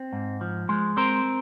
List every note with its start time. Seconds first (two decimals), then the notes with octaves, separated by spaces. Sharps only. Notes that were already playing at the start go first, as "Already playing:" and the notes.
Already playing: C4
0.13 G#2
0.41 F3
0.69 G#3
0.97 C4 A#4 C5